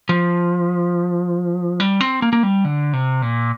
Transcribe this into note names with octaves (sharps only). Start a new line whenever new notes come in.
F3
G3
C4
A#3
A#3
G3
D3
C3
A#2